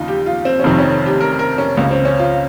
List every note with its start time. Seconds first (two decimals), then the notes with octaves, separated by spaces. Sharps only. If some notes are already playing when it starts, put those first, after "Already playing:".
Already playing: D#2 C#3 D#4 F4
0.08 G4
0.26 F4
0.45 C4
0.60 C#4
0.64 F1 F2 C3 D#3 C4
0.79 C#4
1.06 G4
1.21 A#4
1.39 A#4
1.58 C#4
1.77 C#2 C#3 C#4
1.91 C4
2.05 C#4
2.19 F4